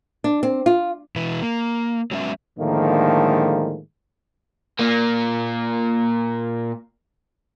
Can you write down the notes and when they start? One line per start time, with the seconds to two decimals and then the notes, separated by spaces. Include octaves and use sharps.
0.24 D4
0.43 C4
0.66 F4
1.16 B2 E3 E4 B4
1.42 A#3
2.11 F#3 G#3 B3 C#4 E5
2.59 A2 D3 D#3 F3 G#3 A#3
4.79 A#2 A#3